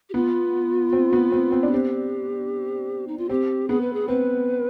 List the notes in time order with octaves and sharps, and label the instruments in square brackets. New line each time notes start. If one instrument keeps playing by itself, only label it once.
[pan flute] G4
[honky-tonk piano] B3 [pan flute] F4
[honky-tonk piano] C4
B3
C4
C4
D4
[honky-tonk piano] C4 [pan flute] G4
[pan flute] D#4
F4
[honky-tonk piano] C4 [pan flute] G4
[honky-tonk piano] B3 [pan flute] G#4
[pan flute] B4
G#4
[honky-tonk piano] C4 [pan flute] B4